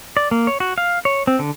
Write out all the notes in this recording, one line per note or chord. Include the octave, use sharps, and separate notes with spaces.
D5
A#3
C#5
F#4
F5
C#5
C4
D3